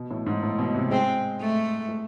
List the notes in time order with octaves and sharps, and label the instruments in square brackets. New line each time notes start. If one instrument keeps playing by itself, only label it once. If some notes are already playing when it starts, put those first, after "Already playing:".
Already playing: [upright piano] B2
A2
G#2
A2
B2
C3
[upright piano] G#3 [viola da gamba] C4
[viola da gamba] A3
[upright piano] A3